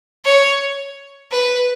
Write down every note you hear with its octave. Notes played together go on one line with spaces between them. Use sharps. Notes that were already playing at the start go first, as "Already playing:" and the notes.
C#5
B4